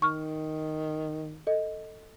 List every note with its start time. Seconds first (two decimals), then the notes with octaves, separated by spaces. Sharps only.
0.02 D#3 C#6 F6
1.47 A4 D#5